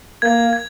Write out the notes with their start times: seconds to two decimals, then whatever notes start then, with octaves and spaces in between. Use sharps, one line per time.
0.22 A#3 G#6
0.53 G#6